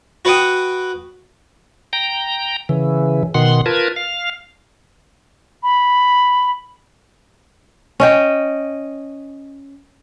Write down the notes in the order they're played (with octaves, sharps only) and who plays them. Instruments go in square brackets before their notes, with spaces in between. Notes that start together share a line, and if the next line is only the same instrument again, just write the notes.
[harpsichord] F#4 B4 F#5 G5 D#6
[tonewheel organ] G5 A#5
C#3 E3
B2 D#3 F#5 C6
F4 A#4 B4 A5 G#6
F5
[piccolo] B5
[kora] C#4 D#5 G5